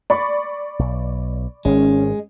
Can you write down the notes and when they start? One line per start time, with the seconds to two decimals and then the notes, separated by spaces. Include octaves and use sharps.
0.10 D5 B5 C#6
0.79 B1
1.65 G#1 D#3 G#3 C#4